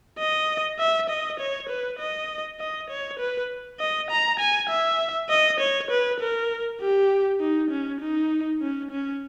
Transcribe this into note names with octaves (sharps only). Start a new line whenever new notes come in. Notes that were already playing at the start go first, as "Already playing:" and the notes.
D#5
E5
D#5
C#5
B4
D#5
D#5
C#5
B4
D#5
A#5
G#5
E5
D#5
C#5
B4
A#4
G4
D#4
C#4
D#4
C#4
C#4